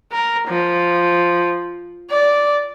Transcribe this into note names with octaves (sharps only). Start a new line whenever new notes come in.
A#4
F3
D5